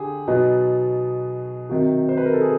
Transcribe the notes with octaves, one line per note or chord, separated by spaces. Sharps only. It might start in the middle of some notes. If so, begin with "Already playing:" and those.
Already playing: D3 G4 G#4
B2 F#3 B3 D#4
C3 D#3 F#3
C5
B4
A#4
A4
G#4